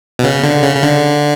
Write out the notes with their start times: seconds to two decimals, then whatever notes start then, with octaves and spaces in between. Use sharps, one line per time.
0.19 B2
0.24 C#3
0.43 D3
0.63 C#3
0.75 C#3
0.83 D3